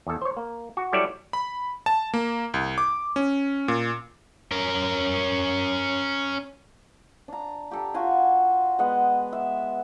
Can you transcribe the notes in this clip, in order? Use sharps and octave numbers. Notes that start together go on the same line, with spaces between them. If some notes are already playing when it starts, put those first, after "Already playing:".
E2 A4
C5 C#5
A#3
F#4
F#3 G3 E4 A4 C#5 D5
B5
A5
A#3
C2
D6
C#4
A#2
C#4 A#4
D4 A#5
G4 A4 A#5
F4 F#4 G#5 C6
G#3 B3 D#5 F#5
E5